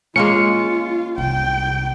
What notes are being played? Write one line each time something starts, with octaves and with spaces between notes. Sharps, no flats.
G#3 A#3 C#4 F4 C#7
C2 G5